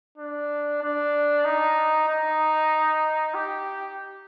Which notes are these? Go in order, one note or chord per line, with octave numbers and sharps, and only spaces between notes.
D4
D4
D#4
D#4
G4